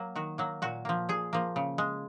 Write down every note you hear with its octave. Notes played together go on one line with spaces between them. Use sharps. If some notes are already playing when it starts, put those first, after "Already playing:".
Already playing: F#3 A#3
D#3 F#4
F#3 A#3
A#2 F#4
F3 A#3
A#2 G#4
F3 A#3
C#3
G#3